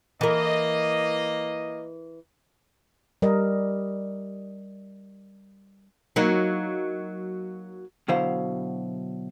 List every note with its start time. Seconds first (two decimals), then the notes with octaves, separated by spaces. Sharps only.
0.21 E3 A#3 A#4 D#5
3.22 G3 A#4 D#5
6.16 F#3 A#3 D#4
8.08 B2 D3 F#3 E4 C5 F5